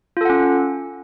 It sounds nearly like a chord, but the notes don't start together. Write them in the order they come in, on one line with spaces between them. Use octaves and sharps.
F4 A4 F#5 C#4